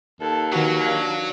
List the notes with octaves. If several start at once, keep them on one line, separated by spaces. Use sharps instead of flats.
D#2 A4
D#3 F#3 F#4 B4
D4 F5